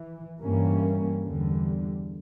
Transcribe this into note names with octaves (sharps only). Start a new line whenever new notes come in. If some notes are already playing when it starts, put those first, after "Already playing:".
Already playing: E3
G2 E3 G3 A#3 C#4
E2 D3 G3